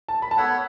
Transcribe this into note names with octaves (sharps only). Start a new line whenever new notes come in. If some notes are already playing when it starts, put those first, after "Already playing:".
A5
B5
A5
B3 A4 C#5 F#5 B5